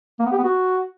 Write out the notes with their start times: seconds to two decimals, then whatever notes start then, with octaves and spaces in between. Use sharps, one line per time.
0.20 A#3
0.26 B3
0.32 G4
0.38 B3
0.44 F#4